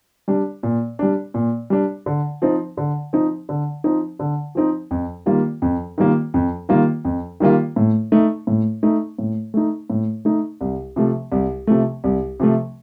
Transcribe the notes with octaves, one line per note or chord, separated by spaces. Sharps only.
G3 D4
A#2
G3 D4
A#2
G3 D4
D3
F3 C4 D#4
D3
F3 C4 D#4
D3
F3 C4 D#4
D3
F3 C4 D#4
F2
D#3 G3 A#3 F4
F2
D#3 G3 A#3 F4
F2
D#3 G3 A#3 F4
F2
D#3 G3 A#3 F4
A2
A3 D#4
A2
A3 D#4
A2
A3 D#4
A2
A3 D#4
C2
C3 F3 A3
C2
C3 F3 A3
C2
C3 F3 A3